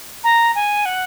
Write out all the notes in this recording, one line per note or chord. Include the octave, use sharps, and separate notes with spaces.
A#5
G#5
F#5